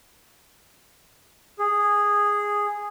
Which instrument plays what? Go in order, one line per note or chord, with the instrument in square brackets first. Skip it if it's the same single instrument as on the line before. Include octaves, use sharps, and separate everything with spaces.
[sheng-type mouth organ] G#4